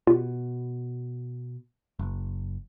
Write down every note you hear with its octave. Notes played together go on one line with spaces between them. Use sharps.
B2 F4 G4
F#1